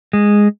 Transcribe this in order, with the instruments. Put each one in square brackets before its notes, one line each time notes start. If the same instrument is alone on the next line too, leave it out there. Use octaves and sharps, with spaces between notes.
[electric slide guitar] G#3